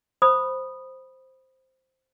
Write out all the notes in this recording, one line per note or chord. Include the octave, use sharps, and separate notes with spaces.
C5 B5 D#6